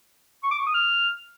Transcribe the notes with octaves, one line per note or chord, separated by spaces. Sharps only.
C#6
D6
C#6
D#6
F6